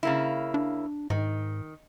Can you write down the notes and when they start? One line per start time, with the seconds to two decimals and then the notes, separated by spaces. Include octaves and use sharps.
0.03 C#3 A#3 E4
0.54 D4
1.10 G#2 D#3